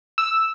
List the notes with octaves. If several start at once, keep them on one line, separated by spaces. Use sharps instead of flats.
E6